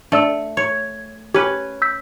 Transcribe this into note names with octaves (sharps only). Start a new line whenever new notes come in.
A3 D4 D5 E6
C#5
C#4 G4 B4
E6 G6 B6